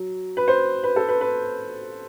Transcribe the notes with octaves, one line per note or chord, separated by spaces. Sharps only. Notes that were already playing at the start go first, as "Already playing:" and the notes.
Already playing: F#3
B4
C5
B4
A4
B4
B4